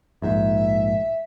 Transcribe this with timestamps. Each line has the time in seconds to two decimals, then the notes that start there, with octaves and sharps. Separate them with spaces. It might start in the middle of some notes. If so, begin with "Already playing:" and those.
0.22 A#1 G#2 E5